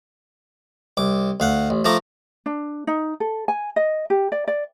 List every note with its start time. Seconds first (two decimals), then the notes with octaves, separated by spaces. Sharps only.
0.97 C2 D6
1.40 D2 F5 F#5
1.70 A1
1.85 F3 A3 A#5 D6
2.46 D4
2.87 D#4
3.20 A4
3.48 G#5
3.76 D#5
4.10 G4
4.32 D5
4.48 D5